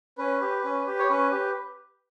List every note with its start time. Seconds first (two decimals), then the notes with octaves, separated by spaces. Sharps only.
0.18 C#4 B4
0.41 G4
0.64 C#4
0.87 G4
0.99 C#5
1.10 C#4 B4
1.32 G4